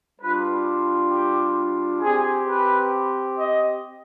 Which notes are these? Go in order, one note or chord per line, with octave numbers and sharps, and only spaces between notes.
G3 D4 F4 B4
G4
C4 G4 G#4
B4
D#5